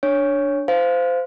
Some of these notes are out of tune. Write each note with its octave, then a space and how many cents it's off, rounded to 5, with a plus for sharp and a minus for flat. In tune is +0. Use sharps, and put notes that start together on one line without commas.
D4 -5 C#5 +0
C5 -20 F5 -5